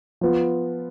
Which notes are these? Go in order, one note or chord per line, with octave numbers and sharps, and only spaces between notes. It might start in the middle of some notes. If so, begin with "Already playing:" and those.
F3 B3 F4